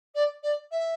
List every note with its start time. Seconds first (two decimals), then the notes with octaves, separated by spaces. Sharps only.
0.14 D5
0.43 D5
0.71 E5